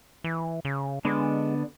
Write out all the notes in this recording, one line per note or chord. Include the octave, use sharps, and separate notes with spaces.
E3
C#3
D3 G#3 B3 D4